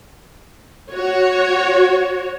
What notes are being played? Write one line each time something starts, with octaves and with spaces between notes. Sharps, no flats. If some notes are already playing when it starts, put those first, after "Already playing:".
F#4 C#5